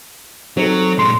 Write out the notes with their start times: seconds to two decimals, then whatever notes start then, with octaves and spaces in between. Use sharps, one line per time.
0.57 F#3 C4 D#4 A4
0.99 A#2 G#3 C6